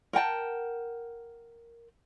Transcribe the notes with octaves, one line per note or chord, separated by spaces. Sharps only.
A#4 F#5 G5 A5